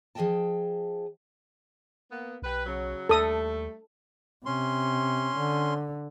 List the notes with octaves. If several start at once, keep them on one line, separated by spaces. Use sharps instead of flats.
F3 G#4 A#4 D#5 G5 A5
A#3 B3
B1 G4 B4
C#3 F#3
D#2 G3 A3 A4 D#6
C3 C#4 C6
D3